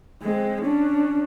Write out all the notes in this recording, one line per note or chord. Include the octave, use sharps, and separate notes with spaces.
G#3 C4
C#4 D4